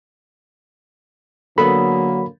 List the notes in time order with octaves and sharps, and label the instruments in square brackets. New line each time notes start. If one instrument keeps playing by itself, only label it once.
[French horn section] D3 A#3 [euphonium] F#3 [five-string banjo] B3 G#4 A4 [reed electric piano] B5